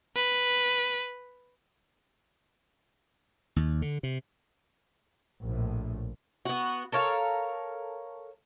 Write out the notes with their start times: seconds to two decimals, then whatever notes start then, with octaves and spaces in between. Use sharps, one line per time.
0.16 B4
3.56 D#2
3.82 D3
4.03 C3
5.43 A#1 A2
6.45 B3 F#4
6.92 A4 A#4 C#5 F5